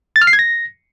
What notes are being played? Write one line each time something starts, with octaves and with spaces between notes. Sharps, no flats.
A6
F6
C7
G#6
A#6